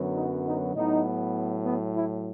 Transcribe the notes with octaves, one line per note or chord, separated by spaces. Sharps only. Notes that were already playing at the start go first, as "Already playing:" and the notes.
Already playing: F#2 D3 F#3 B3
D#4
D#4
A2 F#3 B3 D#4
B3
E4